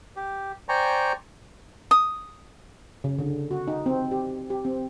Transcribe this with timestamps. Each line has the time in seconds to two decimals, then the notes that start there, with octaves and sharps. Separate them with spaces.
0.16 G4
0.69 C5 D5 G5 G#5 A#5 C#6
1.91 D#6
3.04 C#3
3.19 D3
3.51 F#4
3.68 D#4
3.86 C4
4.11 G4
4.50 G4
4.65 C4